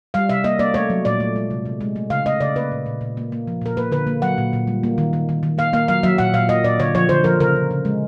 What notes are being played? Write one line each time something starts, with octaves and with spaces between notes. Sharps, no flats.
G3 F5
C3 E5
A#3 D#5
A#3 D5
A3 C#5
F#3
A#2 D5
A3
G#3
C3
C3
G#3
A3
C#3 F5
A3 D#5
C#3 D5
A#3 B4
A#2
A#2
A#2
A#3
A#3
F3
A#2 A#4
A#3 B4
D3 B4
A#3
F#3 F#5
A#2
A#2
G3
A#3
D#3
D#3
D#3
D#3
A#3 F5
A#3 F5
F#3 F5
F#3 E5
A#2 F#5
A#2 F5
A#3 D#5
A#2 D5
D3 C#5
F3 C#5
D3 C5
F3 A#4
C#3 A#4
C#3
C#3
G#3